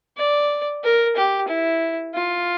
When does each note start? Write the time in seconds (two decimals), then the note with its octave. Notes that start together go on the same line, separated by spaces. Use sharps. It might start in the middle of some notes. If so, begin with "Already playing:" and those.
0.17 D5
0.84 A#4
1.16 G4
1.48 E4
2.14 F4